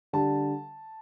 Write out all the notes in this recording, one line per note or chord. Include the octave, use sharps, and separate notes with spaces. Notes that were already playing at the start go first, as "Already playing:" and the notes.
D3 G3 A5